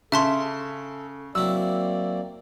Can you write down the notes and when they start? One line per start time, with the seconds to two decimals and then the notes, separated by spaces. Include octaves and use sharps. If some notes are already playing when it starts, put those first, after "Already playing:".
0.12 C#3 A4 E5 A5 C6
1.35 F#3 A#3 C4 E4 D5 E6